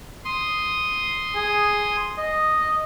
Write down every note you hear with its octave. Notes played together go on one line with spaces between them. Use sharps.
C6 D#6
G#4
D#5